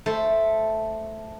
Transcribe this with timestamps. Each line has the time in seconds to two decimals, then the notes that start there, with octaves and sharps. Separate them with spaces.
0.06 A3 A4 C5